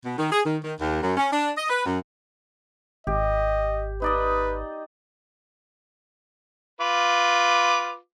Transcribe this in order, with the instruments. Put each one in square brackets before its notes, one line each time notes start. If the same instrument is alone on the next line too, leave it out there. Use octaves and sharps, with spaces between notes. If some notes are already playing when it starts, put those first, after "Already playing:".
[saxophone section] B2
D#3
G#4
D#3
D#3
D#2
F#2
C#4
D4
D#5
B4
F#2
[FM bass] G#1 [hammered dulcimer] G4 [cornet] D#5
[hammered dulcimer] D#4 D5 D#5 [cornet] B4
[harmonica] F4 B4 D6